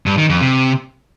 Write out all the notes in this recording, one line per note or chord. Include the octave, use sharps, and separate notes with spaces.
G2
D#3
F2
C3